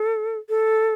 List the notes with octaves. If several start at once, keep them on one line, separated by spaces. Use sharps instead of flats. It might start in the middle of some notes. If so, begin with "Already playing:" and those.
Already playing: A4
A4